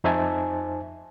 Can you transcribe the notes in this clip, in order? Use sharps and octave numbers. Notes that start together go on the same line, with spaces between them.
F2 D#4 C5 E5 G#5 A5